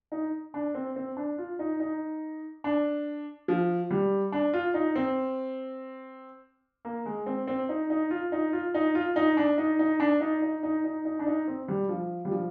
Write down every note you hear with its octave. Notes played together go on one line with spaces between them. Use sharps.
D#4
D4
C4
C4
D4
F4
D#4
D#4
D4
F3
G3
D4
F4
D#4
C4
A#3
G#3
C4
C4
D#4
D#4
F4
D#4
F4
D#4
F4
D#4
D4
D#4
D#4
D4
D#4
D#4
D#4
D#4
D#4
D4
D#4
C4
G3
F3
G3
F3